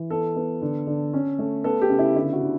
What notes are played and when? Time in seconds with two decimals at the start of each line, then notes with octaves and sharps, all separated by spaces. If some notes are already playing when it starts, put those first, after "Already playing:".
Already playing: E3
0.10 B3 A4
0.36 B3
0.62 D3
0.87 D3
1.13 C#4
1.39 A3
1.64 B3 A4
1.81 G4
1.90 C#3
1.99 E4
2.16 D3 E4
2.33 F#4
2.42 D3